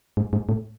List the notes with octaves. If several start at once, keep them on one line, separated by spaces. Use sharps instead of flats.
G#2
G#2
A2